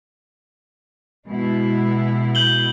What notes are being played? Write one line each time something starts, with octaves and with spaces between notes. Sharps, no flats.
B2 G#3 E4
G6 F#7 G7